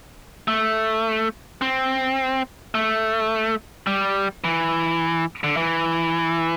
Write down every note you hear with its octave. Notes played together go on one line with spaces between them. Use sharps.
A3
C4
A3
G3
E3
D3
E3